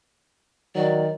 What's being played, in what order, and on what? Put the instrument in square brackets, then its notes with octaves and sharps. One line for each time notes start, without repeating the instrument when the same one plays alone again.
[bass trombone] D#3 [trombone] F#3 [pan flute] D5